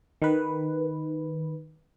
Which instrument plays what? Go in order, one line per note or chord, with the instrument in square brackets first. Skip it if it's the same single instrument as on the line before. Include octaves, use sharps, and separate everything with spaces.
[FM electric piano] D#3 B4